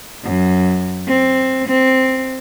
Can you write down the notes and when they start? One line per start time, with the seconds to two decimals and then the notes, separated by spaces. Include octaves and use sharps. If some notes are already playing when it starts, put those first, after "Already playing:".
0.24 F#2
1.08 C4
1.68 C4